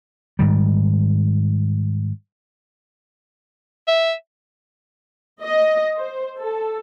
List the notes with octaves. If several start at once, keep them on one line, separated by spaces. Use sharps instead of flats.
G#2 D#3 G3
E5
D#5
C5
A4